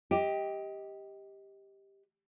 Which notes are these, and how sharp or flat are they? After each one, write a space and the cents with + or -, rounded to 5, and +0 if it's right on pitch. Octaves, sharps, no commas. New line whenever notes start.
G4 +5 D#5 +20